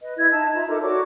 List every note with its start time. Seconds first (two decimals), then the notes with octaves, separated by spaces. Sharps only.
0.01 B4 D#5
0.17 E4 B4 D#5 G#6
0.32 D#4 D#5 A5
0.55 F4 E5 A#5
0.69 D#4 A4 A#4 D6
0.81 F#4 C#5 D5 D6